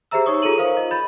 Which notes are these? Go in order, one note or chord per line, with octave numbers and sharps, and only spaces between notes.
G4 G#4 C5 E5 A#5 E6
D#4 C#5 C#6 D#6
F4 G#4 A4 A#5 D#7 F#7
A#4 C5 F5 D#6
D#5
B5 G6 A6